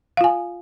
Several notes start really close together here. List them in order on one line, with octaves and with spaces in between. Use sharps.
F5 F4 G#5